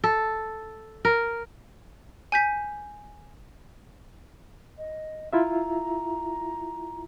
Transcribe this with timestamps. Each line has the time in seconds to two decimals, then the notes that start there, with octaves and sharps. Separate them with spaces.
0.04 A4
1.05 A#4
2.32 G#5 G6 B6
4.78 D#5
5.33 E4 F4 E5 A#5